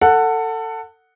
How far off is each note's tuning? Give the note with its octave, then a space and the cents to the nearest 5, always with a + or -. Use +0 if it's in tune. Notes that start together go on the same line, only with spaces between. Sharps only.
A4 +25 F#5 +0